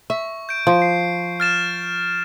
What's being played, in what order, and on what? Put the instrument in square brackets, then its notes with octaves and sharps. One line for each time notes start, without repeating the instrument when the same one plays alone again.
[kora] E5 [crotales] C#6
[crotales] G6 D7
[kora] F3
[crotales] C7
F6 A6 E7